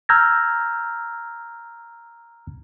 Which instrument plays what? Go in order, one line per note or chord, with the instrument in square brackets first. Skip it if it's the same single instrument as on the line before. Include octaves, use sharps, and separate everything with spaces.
[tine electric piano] A#5 E6 F6 G6 G#6 A#6